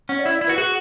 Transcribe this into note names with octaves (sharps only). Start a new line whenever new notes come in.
C#4 F#5
D5
E4 E5
D5
E4
F#4 B4
F#4 G#4